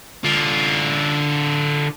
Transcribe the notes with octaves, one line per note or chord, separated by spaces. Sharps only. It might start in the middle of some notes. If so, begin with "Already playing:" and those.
D3 F4